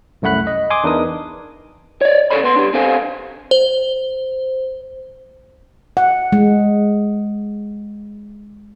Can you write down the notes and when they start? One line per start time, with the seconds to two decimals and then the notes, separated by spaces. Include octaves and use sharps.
0.22 C2 F#2 A3 F#5 B5 F#6
0.47 D#5
0.70 G#5 C6 D6 D#6
0.84 E2 D4 D#4 A#4 B4 D#6
2.01 C#5 D5
2.31 C#3 E3 A4 C#5 D5 B5
2.43 B3 C6
2.56 D4 G4
2.73 C4 D4 A4 C5 F5 G#5
3.51 C5
5.97 F#5
6.32 G#3